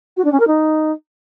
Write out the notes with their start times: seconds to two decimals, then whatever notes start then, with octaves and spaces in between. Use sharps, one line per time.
0.17 F#4
0.24 D4
0.32 C#4
0.40 A#4
0.47 D#4